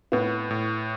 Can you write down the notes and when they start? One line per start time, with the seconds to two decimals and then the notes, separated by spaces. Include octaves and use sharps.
0.12 A2 B3
0.51 A2